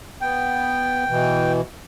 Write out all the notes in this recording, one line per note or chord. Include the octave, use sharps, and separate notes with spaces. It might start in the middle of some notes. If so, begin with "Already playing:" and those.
B3 G5
B2 E3